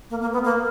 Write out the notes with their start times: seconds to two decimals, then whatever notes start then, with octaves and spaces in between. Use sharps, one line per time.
0.10 A#3
0.21 A#3
0.33 B3
0.44 A#3